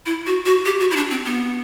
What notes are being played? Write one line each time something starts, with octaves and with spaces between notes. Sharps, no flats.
E4
F#4
F#4
G4
F#4
E4
D4
C4
B3